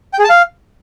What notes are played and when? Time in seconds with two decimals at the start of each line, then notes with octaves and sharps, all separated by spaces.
0.13 G5
0.19 G#4
0.24 A5
0.30 F5